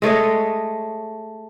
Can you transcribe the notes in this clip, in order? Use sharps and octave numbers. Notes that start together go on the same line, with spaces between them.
G#3 A3 C#5 D#5